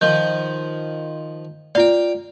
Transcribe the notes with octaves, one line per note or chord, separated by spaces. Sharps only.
D#3 F3 G6
F4 D5 F5 G5